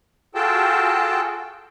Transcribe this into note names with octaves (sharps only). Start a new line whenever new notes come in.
F4 F#4 G#4 A4 G5 A5